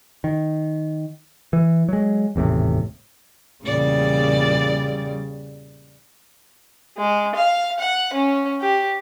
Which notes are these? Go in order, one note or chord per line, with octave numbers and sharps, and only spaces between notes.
D#3
E3
F#3 G#3
G#1 E2 A2 C3
E2 A#2 C#3 G3 D5
G#3
F5
F#5
C#4
G4